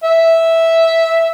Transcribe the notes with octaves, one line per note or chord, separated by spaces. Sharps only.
E5